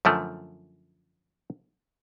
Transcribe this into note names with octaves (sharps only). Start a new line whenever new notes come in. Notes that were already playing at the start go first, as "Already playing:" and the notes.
F#2 D3 F3 A3